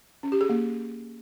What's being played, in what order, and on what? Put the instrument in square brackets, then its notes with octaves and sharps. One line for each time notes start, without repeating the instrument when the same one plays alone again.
[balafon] C#4
G4
G#4
A#3